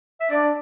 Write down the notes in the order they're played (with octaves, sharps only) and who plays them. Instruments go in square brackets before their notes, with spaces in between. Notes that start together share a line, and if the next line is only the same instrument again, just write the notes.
[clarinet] E5
[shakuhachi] D4 [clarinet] D5